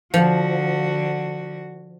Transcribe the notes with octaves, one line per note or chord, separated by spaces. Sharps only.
D3 F3 F#4